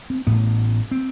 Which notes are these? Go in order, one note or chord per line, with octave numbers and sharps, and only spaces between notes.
C4
A1 A2 B3
C4